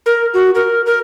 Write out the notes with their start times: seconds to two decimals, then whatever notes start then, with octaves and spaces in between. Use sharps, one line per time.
0.06 A#4
0.34 F#4
0.55 A#4
0.86 A#4